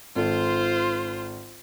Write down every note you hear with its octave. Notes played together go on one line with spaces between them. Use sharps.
G#1 F4 A4 C5